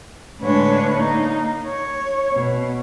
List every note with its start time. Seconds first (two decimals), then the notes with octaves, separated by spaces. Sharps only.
0.41 A2 D3 G#3 D4 B4 C#5
0.93 A#3 D#4
1.65 C#5
2.33 B2